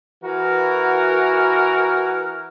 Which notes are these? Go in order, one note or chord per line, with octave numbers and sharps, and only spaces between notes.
E3 F#4 A#4